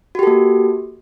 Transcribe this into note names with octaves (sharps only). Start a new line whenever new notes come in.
A#3 F#4 G4 A4